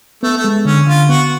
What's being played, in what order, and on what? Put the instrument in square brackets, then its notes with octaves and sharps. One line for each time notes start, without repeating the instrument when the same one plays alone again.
[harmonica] A3 [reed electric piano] B3
[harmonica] A3
[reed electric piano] G#3
[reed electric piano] D3 [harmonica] C#4
[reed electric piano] D3 [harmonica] F4
[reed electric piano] B3 [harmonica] F#4